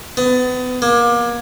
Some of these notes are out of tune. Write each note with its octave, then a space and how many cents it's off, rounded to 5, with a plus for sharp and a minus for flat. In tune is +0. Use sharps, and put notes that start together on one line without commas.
B3 +30
A#3 +30